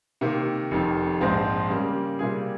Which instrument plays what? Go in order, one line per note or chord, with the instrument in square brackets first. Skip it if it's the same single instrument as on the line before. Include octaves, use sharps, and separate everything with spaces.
[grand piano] C3 D#3 A#3
F1 F2 D#3
A#1 G#2 F3 C4 F4
C#3 G3 A#3
C3 G3 A#3 F4 G#4